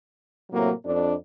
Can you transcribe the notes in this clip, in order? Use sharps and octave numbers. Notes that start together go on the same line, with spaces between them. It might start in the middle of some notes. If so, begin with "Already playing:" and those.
A2 C3 F#3 A#3
F2 D4